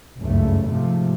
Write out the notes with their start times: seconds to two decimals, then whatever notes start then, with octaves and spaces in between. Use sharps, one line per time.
0.21 F#1 C#2 G2 A3
0.68 G#2 C3 F3 A3